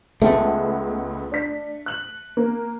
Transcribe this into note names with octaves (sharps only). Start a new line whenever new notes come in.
C#2 G#3 A3 B3
D4 B6
F#6 F#7
A#3